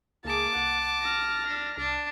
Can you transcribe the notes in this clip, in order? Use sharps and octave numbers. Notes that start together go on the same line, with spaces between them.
C#2 A#3 G#4 A5 D6
C2 F#5
F6 A#6
D4
C2 D4